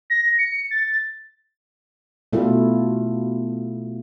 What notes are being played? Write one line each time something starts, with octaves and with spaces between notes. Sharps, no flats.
A#6
C#7
A6
B2 A3 E4 F4 A4